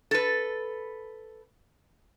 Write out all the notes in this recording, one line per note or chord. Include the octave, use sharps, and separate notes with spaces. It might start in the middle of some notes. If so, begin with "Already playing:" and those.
A4 B4